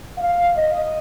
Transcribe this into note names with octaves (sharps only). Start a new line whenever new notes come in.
F5
D#5